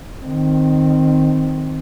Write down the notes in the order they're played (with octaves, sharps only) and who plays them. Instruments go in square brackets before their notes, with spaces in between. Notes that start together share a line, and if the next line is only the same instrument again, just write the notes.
[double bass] D#3 C4